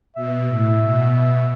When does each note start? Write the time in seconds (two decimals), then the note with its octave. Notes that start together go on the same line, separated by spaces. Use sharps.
0.16 B2 E5
0.49 A2
0.81 B2